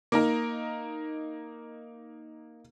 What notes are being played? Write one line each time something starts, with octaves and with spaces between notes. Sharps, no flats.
A#3 D#4 A#4